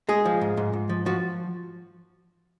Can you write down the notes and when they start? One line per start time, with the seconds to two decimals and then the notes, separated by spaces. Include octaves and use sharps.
0.09 G#3 G#4
0.25 F3
0.41 G#2
0.57 G#2
0.73 G#2
0.89 F3
1.06 F3 F#4